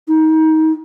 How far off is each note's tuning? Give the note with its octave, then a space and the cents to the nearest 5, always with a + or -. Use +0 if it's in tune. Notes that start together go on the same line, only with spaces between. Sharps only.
D#4 +25